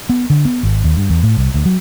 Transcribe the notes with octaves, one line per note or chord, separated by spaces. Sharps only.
B3
D3
B3
G#1
D#2
G2
E2
A2
C2
D2
F#3